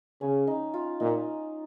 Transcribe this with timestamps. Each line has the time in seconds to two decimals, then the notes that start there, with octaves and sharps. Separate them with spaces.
0.21 C#3 C#4
0.47 D#4
0.74 F4
1.00 A#2 D#4